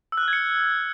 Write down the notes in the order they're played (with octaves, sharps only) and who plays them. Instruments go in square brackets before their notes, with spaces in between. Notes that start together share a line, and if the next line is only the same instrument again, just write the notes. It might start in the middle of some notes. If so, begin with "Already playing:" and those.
[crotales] E6
F#6
F6
G#6
C#7